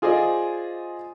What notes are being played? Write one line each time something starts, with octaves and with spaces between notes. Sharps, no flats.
F4 G#4 C5 D5 D#5